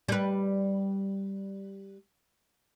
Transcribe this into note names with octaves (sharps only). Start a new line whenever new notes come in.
G3 B4